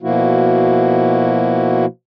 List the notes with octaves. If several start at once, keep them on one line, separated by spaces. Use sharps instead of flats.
B2 F3 A#3 E4 F#4